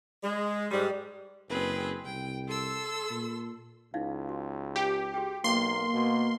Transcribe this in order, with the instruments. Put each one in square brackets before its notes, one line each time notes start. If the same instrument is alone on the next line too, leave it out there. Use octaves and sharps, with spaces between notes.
[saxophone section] G#3
G#2 G3
[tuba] F#1 [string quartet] C4 G#4 B4
[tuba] C2 [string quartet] G5
[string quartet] A4 C6 E6
[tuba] A#2
[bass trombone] C#2 [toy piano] D#4 E4 F5
[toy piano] F#4
[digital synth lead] G4 [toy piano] G5
[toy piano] F#4 G#4 G5
[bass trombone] B1 [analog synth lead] A#3 [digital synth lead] C6
[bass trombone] B2